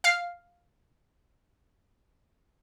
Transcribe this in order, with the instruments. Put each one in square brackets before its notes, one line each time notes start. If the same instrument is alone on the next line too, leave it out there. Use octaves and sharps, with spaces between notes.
[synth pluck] F5 F6 C7